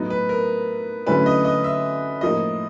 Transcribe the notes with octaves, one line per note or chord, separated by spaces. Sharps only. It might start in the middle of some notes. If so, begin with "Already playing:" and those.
Already playing: A2 F#3 B3 D#4
B4
A#4
D3 F#3 A3 C#4 E4 B4
D#5
D#5
E5
A2 F3 A#3 D#4 D#5